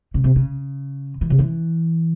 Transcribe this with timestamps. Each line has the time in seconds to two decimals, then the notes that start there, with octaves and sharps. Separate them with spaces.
0.14 C#3
0.24 C3
0.36 C#3
1.21 E3
1.30 C#3
1.39 E3